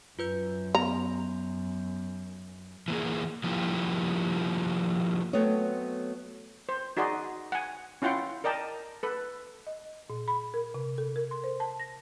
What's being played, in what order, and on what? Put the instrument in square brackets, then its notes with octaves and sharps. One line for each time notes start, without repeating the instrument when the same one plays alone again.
[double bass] F#2 [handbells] F4 B4 G6
[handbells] B3 C6 [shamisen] A#5
[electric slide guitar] E3 A#3 G#4
F3 A#3 E4 F4 G4
[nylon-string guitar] F#3 A3 B3 C4 C#5 D#5
[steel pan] C5
D#4 F#4 G#4 D5 D#5 C6
F#5 G#5
C#4 E4 F4 F#5 G5 C6
A#4 D5 D#5 G5 A5 A#5
A4 B4
[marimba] D#5
A#2
B5
A#4
C3
A4
A#4
C6
C5
A5
A#6